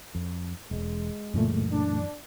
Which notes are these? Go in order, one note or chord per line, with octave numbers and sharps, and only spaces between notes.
F2
E1 G#3
C#2 F#2 A#2 E3 A3 A#3
D4